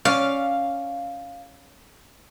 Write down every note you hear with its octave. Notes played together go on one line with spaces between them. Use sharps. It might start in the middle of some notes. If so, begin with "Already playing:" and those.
C#4 D5 F5